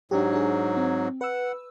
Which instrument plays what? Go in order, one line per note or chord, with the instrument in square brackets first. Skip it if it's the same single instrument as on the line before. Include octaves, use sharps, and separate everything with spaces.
[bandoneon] G#2 F#3 [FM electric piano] D4 G4
[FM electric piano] D4 G#4
C4
[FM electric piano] B4 E6 [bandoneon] F#5